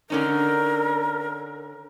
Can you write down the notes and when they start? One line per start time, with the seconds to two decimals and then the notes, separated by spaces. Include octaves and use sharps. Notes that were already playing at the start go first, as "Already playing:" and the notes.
0.10 D3 C#4 D#4 A#4